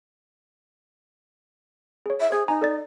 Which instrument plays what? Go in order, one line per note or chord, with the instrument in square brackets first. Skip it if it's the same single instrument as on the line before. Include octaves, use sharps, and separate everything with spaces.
[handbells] G#4 C#5
[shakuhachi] E5
[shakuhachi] G#4 [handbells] C5 G#6
[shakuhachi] D#4 [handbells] G#5 A#5
[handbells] A4 D5 A6